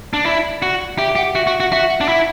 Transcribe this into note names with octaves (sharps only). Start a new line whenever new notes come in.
D4
E4 D5
F#4
G4 E5
G4 F#5
F#4 E5
F#4
F#4
F#4 E5
F#5
D4
E4